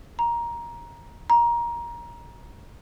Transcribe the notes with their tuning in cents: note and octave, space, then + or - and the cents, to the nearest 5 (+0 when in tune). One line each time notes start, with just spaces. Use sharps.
A#5 +15
A#5 +20